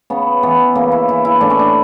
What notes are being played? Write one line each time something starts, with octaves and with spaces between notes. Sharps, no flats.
C#3 B3
E3 B3
C#3 A#3
E4
E3 E4
E4
A2 D4
C#4
D4